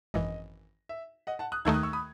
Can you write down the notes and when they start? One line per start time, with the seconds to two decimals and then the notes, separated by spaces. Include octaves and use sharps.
0.14 G#1 F#2 E3 D#5
0.89 E5
1.27 D#5 F#5
1.39 F#5 A5
1.52 D#6 F#6
1.65 D#2 D#3 A3 D#4 E6 G#6
1.74 D#6 F#6
1.83 C#6 E6
1.93 B5 D#6